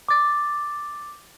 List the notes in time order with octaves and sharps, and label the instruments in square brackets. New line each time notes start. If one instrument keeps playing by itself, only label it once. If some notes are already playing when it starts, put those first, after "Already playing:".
[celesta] D6 A6